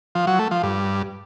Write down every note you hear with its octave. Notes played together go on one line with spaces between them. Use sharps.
F3
F#3
A3
F3
G2